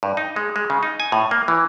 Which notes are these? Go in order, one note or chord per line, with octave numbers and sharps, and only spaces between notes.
G2
D#4
G#3
G#3
C#3
D#4
G#5
A2
A#3
E3